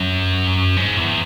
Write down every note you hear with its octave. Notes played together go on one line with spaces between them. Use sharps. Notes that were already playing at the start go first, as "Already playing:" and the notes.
Already playing: F#2
G#2
E2